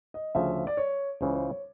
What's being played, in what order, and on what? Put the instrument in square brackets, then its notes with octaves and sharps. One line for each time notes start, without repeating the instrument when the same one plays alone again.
[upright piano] D#5
[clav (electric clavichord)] D2 C#3 F3 [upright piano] E5
[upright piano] D5
C#5
[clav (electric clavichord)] C#2 C#3 E3 [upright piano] C5
[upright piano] C5
C#5